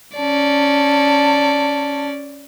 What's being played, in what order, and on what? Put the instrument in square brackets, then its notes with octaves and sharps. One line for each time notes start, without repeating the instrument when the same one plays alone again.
[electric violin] C#4 D5 [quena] A5